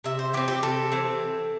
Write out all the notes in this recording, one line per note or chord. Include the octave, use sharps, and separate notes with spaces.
C3 E5
C5
E3 C4 G4
G4
C3 A4
E3 C4